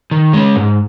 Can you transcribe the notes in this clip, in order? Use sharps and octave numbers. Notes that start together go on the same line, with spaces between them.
D#3
G#3 C#4
G#2